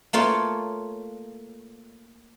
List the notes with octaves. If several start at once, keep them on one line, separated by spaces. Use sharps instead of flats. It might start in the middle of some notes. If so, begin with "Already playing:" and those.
A3 A#3 F4 C#5